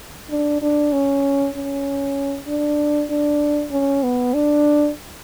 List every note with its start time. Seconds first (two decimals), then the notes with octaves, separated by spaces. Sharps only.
0.30 D4
0.62 D4
0.92 C#4
1.54 C#4
2.47 D4
3.10 D4
3.72 C#4
4.03 B3
4.34 D4